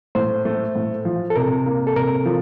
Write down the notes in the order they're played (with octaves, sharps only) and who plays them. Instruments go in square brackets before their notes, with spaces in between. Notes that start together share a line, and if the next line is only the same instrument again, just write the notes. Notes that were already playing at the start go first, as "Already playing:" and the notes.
[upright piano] A2 [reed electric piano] C5
[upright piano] A3
A2
F3
[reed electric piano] A4
[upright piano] C3 [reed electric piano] A#4
[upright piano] A#3
[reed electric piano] A4
[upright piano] C3 [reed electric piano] A#4
[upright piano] F3